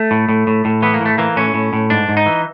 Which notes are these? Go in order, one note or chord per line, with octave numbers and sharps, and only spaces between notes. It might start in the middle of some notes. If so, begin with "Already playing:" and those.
Already playing: A3
A2
A2
A2
A2
E3 B3
A#3
A2 A3
E3 A#3
A2 C#4
A2
A2
G#2 D4
G#2
D#4
E3